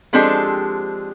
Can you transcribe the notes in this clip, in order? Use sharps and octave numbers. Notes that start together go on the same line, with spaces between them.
F3 G#3 C4 D4 G4 A4